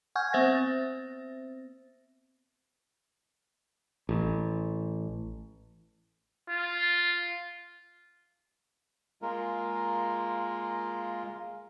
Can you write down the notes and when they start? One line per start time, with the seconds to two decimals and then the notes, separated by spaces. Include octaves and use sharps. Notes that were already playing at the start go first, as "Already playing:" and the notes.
0.15 F#5 G#5 C#6 F6 G6 G#6
0.33 B3 C4 C5 E5 A6 A#6
4.09 A1
6.49 F4
9.22 G#3 A#3 F4 A#4